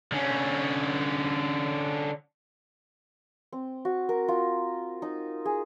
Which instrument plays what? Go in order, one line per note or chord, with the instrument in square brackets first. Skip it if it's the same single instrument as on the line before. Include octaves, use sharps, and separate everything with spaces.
[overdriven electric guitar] D3 C#4
[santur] C4
F#4
A#4
F4
D#4
G#4